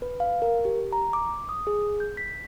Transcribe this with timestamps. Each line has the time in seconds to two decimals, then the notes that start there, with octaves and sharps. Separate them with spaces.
0.02 B4
0.20 F5
0.42 A#4
0.65 G4
0.93 A#5
1.13 D6
1.49 D#6
1.67 G#4
2.00 G6
2.17 B6